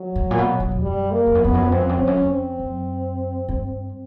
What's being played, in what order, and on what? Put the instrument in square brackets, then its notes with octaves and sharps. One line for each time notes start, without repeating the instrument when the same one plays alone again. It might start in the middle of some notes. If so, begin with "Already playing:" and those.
Already playing: [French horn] F#3
[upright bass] G#2
A#2
B2
B2
F2
[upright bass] F#2 [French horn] G3
[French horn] A#3
[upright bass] F2
F#2
[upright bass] F2 [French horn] B3
[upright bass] F#2
F2
[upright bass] F#2 [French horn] C4
[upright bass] F2
F#2
[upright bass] F2 [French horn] C#4
[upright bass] F#2
F2
[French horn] C4
[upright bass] F#2
G2